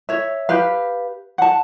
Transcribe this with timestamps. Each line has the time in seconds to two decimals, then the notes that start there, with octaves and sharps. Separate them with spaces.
0.09 C#5 E5
0.49 G4 B4 F5
1.38 F#5 A5